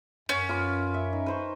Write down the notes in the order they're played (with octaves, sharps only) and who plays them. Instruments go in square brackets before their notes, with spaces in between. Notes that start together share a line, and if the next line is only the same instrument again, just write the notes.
[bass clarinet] F#2 [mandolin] C#4 [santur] C#5 F#5
[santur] F4 B4 D6
E5
D#4
B4 C5 C#6